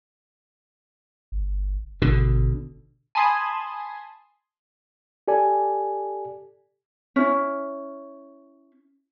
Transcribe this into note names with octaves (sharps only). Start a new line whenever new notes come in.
G1
G#1 B2 D3
G#5 A5 B5 C6 D#6 G#6
G4 A4 D5 G#5
C#4 E4